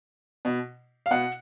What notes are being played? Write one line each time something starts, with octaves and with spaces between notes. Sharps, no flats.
B2
F5
B2 F#5